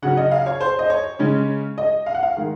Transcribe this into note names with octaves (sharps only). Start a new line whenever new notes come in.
C#3 F#3 C#4 F#5
D#5
F5
C#5
C5
D#5
C#5
C#3 G#3 C#4
D#5
F5
F#5
F5
D#3 G#3